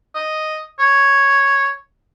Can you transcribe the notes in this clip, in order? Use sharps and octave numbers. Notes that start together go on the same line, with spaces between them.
D#5
C#5